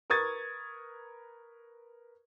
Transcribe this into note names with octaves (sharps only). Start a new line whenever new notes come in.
A#4 B4 C#6 D#6 G#6 A6